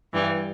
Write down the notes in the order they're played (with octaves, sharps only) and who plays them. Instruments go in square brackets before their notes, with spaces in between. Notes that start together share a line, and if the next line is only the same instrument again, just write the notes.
[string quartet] G2 E3 G3